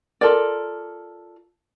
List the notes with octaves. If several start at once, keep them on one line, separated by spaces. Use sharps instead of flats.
F4 A4 A#4 D5